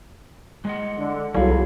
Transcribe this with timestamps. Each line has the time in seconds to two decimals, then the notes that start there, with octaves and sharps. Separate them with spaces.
0.65 G#3 D#5 F#5
0.97 D3
1.35 G1 C2 F#3 G3 E4 F4 G#4 A4